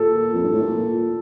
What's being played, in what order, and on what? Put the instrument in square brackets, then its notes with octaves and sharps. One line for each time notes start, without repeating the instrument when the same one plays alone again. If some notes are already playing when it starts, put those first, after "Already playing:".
Already playing: [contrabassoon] A#2 [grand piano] A4
[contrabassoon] F2
G2
A2
A#2